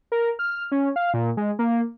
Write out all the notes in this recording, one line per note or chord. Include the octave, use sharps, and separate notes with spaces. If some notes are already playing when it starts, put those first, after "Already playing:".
A#4
F6
C#4
F5
A#2
G#3
A#3